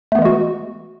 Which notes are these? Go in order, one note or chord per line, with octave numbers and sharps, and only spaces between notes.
E3 G#3 A3 B3 F#4